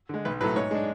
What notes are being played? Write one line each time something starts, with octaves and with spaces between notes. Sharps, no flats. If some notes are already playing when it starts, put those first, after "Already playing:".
D3 G#3
B1 B4
A2 F#3 A3 B4
G#2 C#5
G#3 D4